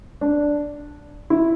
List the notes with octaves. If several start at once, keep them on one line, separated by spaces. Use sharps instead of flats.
D4
E4